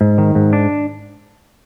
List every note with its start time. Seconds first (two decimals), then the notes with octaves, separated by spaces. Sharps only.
0.01 G#2
0.18 D#3
0.35 G#2
0.53 D4